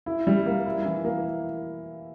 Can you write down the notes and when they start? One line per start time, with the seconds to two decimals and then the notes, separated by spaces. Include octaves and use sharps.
0.06 E4
0.27 G3
0.46 A#3
0.66 E4
0.85 E3
1.05 A#3